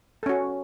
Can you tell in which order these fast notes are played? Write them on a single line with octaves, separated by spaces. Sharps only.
A4 C#4 F#4